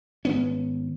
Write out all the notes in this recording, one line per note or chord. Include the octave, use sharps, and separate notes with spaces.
G#1 B3 C#4